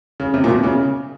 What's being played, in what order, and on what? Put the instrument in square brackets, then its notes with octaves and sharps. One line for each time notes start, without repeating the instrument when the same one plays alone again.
[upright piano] C#3
C3
A#2
B2
C#3